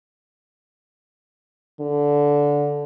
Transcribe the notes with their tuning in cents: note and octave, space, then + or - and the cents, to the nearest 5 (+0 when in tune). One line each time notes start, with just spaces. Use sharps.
D3 -15